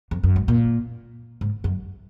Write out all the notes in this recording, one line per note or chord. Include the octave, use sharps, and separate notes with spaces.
F2
F#2
G#2
A#2
G#2
F#2